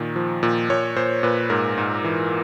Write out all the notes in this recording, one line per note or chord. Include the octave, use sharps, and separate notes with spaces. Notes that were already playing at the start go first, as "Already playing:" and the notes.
Already playing: A#2 D#3
F3
A#2
A#2 C#5
A#2 C5
A#2 B4
G#2 A#4
G#2
E3